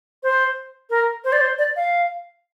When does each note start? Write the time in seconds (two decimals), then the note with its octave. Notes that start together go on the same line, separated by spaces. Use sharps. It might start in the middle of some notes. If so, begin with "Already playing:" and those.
0.23 C5
0.90 A#4
1.24 C5
1.32 D5
1.41 C5
1.58 D5
1.76 F5